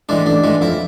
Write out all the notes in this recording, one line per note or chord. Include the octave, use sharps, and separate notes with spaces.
A2 E3 G#3 D4
A1 D4
A2 E3 G#3
F2 E4